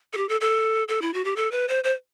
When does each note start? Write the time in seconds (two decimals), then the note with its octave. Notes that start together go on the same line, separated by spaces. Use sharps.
0.13 A4
0.17 G4
0.29 A4
0.41 A4
0.88 A4
1.02 E4
1.14 F#4
1.25 G4
1.36 A4
1.52 B4
1.69 C5
1.84 C5